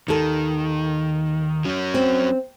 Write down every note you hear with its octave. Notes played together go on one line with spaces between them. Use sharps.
D#2 D#3 A4
F#3 C#4
C4